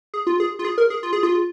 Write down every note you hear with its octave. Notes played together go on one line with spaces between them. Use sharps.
G#4
F4
G#4
F4
G#4
A#4
G#4
F4
G#4
F4